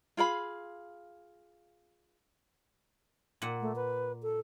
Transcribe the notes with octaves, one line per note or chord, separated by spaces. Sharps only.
F4 G#4 F5 B5
A#2 F#5
A3
B4
A4